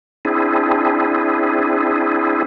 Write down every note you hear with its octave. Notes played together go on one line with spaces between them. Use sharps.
C4 D4 E4 G#4